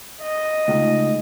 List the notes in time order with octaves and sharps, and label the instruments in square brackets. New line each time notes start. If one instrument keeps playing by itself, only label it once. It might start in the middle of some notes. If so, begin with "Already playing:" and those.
[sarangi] D#5
[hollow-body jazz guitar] C#2 [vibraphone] A3 D#4